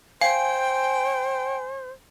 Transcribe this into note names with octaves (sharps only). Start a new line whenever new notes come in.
C5 F5 G5 G#5